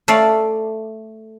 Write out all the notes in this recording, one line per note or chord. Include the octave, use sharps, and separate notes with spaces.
A3 D5 F5